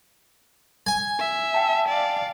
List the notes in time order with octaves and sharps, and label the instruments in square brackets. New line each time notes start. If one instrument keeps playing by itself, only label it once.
[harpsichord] G#5
[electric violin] E5
[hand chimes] G5 A5
[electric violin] D5 F5